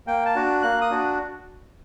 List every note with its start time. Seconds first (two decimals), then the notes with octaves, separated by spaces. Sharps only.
0.07 A#3 G5
0.26 A5
0.35 D4 F#4
0.62 A#3 F#6
0.81 D#6
0.91 D4 F#4